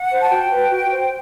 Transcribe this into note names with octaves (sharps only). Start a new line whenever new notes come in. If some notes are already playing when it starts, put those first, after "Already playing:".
Already playing: F#5
C5
A5
F#4 G5
B4
F#4
C5